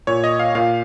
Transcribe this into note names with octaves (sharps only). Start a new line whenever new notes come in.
A#2 C#5
D#5
F5
A#2 F5